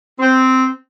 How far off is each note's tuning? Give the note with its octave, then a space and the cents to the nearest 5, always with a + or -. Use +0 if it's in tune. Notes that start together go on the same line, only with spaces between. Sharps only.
C4 -10